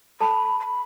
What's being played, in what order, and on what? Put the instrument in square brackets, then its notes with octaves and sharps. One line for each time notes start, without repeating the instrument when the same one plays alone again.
[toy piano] A4 A5 [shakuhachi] B5
[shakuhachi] C6
B5